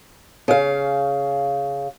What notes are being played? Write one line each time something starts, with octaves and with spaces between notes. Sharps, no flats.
C#3 F5